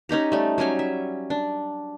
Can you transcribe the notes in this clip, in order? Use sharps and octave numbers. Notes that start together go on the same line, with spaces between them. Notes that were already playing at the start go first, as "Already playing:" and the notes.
C#4 D#4 G4 A#5
G3 A3
F#3 G3 C#4 G#5
E5
D4